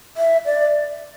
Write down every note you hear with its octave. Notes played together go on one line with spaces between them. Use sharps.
E5
D5